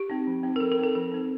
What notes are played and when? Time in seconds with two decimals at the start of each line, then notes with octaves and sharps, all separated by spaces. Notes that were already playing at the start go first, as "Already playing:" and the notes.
Already playing: G4
0.10 C4 D#4
0.27 F3
0.43 C4 D#4
0.56 A#4
0.60 F3 A4
0.72 A#4
0.79 C4 D#4 A4
0.95 F3 A4
1.12 C4 D#4